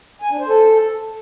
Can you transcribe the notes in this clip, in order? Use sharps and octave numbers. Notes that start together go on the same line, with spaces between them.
G#5
D4
C5
A4